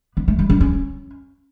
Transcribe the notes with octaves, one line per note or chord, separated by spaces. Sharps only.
B3
A3
G3
D4
C#4